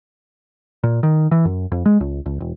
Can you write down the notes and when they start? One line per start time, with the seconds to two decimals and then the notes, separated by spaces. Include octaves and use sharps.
0.83 A#2
1.03 D#3
1.31 E3
1.45 F#2
1.72 F2
1.86 G#3
2.00 C#2
2.26 C#2
2.40 E1